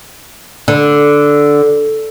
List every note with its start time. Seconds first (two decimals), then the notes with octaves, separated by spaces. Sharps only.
0.68 D3